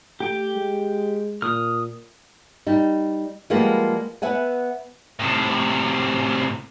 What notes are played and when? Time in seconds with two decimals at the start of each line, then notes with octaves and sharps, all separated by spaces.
0.20 A3 G4 G5
0.55 G#3
1.42 A#2 D#6 F6
2.67 G3 D#4
3.50 F3 G3 G#3 A#3 B3
4.22 B3 E5 F#5 G#5
5.20 A2 C3